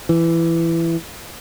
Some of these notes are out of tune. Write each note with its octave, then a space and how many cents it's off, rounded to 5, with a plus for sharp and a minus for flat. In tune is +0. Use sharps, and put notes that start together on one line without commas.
E3 +15